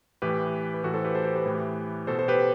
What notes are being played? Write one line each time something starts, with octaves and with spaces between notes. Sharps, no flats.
A2 E3 G4 B4
B4
A2 E3 F#4 A4
A4 C5
G4 B4
A4 C5
G4 B4
G4 B4
A2 E3
B2 A4 C5
A4 C5
G4 B4